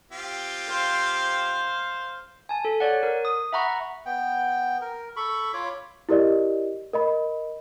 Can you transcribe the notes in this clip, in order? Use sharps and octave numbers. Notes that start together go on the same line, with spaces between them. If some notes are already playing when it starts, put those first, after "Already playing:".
C4 F4 G4
C5 F5
G#5 A5
A4
C#5 D5 F#5
A#4
D#6
E5 F#5 A#5 B5 C#6
B3 G5
A#4
A4 B5 C#6
F4 C#5 B5 D6
E4 G4 A#4 D5 D#5
A#4 D#5 B5